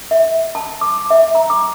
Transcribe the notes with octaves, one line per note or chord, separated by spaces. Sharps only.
E5
A5
D6
E5
A#5
D6